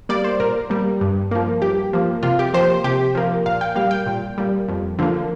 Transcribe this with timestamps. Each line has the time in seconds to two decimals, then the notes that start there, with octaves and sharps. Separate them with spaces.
0.09 G3 A#3 D5
0.24 C5
0.40 A#2 A#4
0.70 G3 A#3
1.01 G2
1.31 F3 A#3
1.62 G2 G4
1.93 F3 A#3
2.23 C3 F4
2.39 G4
2.54 F3 A#3 C5
2.84 C3 G4
3.15 F3 A#3
3.46 A#2 F5
3.61 G5
3.76 G3 A#3 F5
3.91 G5
4.07 A#2
4.38 G3 A#3
4.68 F2
4.99 D3 F3 A#3